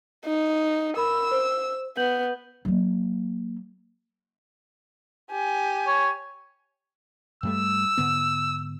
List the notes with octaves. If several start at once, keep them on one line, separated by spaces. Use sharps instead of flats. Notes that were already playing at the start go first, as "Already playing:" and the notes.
D#4
A#4 B5 E6
C5
B3 G6 F#7
F#3 A#3
G4 G#5
C#5
G2 G3 A3 E6
G#2 D3 B3